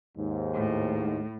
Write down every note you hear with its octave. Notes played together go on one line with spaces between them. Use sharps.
D#2 G#2
A2